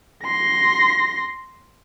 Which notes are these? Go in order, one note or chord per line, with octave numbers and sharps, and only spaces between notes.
C6 A#6